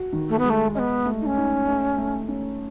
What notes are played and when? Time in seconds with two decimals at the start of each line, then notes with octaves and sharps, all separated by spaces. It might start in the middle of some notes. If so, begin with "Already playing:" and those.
Already playing: F#4
0.13 D#3
0.29 A3
0.38 G#3 B3
0.49 A3
0.75 B3 C#4 D#5
1.05 A3
1.21 D#4
1.26 C#4
1.37 D#4
1.67 A3
1.98 A3
2.28 C#4